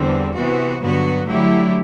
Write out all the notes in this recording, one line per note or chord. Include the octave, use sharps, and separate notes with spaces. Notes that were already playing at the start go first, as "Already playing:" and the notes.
Already playing: E2 D3 G3 C4
C3 E3 B3 F#4
G2 D3 F#3 B3 F#4
D3 F#3 A3 E4 G4